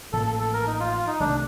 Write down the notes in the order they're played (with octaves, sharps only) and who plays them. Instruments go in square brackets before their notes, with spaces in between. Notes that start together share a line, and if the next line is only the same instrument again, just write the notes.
[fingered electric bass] A1 A2 F3 A#3 [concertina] A4
[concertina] A4
A4
A#4
D#4
F4
F4
D#4
[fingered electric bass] C2 C3 D#3 A3 [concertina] D4